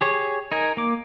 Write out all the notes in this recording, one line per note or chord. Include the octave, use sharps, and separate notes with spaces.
G4 G#4 C#5
D#4 A#4 G#5
A#3 D6